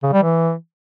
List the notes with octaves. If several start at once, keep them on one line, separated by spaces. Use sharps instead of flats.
C#3
G3
E3